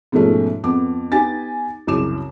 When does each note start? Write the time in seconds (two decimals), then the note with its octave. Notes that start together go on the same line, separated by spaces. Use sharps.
0.12 G#2 B2 F3 G#3 A3 C#4
0.64 F2 B3 D6
1.12 B3 D#4 G4 G#5 A6
1.87 C2 F#2 C#3 D6 E7